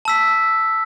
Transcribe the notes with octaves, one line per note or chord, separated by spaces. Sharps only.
A5 E6 B6